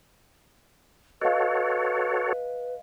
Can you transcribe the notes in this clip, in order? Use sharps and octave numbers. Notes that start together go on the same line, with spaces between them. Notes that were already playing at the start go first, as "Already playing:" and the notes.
F#4 A4 B4 C#5 D#5 F5